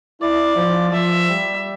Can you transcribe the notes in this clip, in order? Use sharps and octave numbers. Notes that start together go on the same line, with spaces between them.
E4 D5
F3
F3 E5
G3